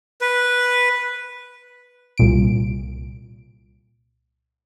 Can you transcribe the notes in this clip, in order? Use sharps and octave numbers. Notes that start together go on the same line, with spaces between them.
B4
C2 A#2 D7